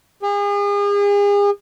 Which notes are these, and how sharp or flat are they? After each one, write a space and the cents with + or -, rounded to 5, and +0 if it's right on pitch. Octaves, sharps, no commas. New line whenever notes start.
G#4 -40